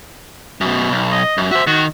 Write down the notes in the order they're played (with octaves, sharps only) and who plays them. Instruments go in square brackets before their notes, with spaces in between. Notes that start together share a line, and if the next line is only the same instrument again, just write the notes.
[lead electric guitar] F#2 B2
B1
[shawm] D#5
[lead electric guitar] F#2
[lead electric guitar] F#4 C5 [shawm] E5
[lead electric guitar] D#3 [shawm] F#4